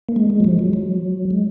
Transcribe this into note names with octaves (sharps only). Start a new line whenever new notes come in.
A#3
G#3
G#3
F#3
F3
F#3
F#3
G#3